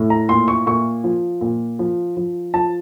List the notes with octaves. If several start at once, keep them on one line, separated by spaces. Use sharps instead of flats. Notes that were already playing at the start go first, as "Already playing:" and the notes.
Already playing: A2
A#5
A#2 C6
C#6
A#2 C#6
F3
A#2
F3
F3
F3 A5